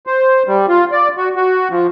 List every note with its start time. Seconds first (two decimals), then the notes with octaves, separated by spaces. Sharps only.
0.07 C5
0.48 G3
0.69 F4
0.92 D5
1.17 F#4
1.36 F#4
1.71 F3